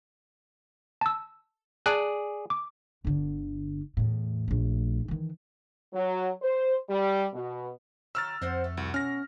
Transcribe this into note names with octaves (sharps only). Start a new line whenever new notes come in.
A5 E6
G#4 D5 G#5 A5 F#6
D6
G1 D3
E2 A2
A#1 A3
D#3 E3
F#3
C5
G3
B2
D#3 F#3 E6 F6 A6
F2 C4 C5 F#5
A3
C2 F#4
B2 C#4 F6 A#6